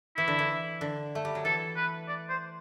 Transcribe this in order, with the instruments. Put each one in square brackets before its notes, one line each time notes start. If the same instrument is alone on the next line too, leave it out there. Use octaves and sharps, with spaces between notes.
[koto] E3 [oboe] E4
[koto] D3
E3
D3
A3
G3
F#3
[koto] E3 [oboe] A4
[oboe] B4
D5
C5